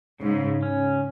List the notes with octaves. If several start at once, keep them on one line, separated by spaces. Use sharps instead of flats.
G#2 C#3
C#4